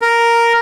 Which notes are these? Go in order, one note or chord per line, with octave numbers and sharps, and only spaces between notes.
A#4